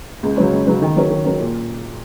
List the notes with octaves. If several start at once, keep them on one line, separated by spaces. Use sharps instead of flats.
C#2
C#3 F#3 C#4
C#2
C#3 F#3 C#4
D#3
F#3 C#4 A#4
D#3
F#3 C#4 A#4
A#2